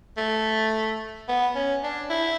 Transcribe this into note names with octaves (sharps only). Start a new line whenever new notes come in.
A3
B3
C#4
D4
E4